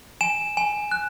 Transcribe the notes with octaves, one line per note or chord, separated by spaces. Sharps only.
G#5 E7
G#5
F#6